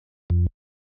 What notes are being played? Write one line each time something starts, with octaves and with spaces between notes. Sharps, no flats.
F2